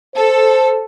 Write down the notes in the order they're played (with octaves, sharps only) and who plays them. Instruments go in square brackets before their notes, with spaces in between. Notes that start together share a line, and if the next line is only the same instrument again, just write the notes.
[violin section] A4 [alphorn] C5